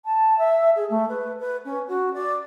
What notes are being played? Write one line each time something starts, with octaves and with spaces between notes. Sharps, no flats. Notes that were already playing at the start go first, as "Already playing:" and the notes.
A5
E5
G#4
A3
B4
B4
C#4
F#4
D5